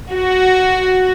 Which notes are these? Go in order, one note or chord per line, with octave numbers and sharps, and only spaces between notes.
F#4